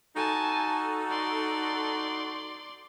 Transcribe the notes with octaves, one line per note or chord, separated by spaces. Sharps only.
D#4 F#4 A4 G#5 A5
D5 C6